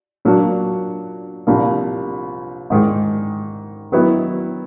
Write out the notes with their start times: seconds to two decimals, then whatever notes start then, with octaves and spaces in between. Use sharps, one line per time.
0.25 A#2 F#3 A#3 D4 F#4
1.47 C2 A#2 F3 A#3
2.70 G#2 D#3 G#3
3.92 D#3 F#3 B3 E4